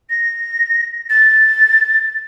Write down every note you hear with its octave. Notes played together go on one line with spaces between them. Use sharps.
A#6
A6